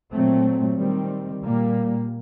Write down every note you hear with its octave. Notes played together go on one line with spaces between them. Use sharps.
A#2 F#3 A3 C4
D#3 G3 C4
A#2 G3 A#3